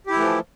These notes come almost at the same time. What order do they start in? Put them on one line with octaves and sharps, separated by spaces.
G4 E4 E3 A3 F3